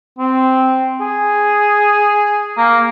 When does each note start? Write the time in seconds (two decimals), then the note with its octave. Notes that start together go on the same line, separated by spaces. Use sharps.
0.18 C4
1.01 G#4
2.58 A#3